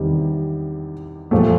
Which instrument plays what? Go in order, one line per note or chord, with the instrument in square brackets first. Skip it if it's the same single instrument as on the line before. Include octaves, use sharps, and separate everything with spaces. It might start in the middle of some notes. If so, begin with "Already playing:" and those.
Already playing: [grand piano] E2 C3 D#3 G3
A#2 F3 A3